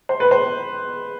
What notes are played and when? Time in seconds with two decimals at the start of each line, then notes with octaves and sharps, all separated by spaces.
0.09 C5
0.20 B4
0.31 C5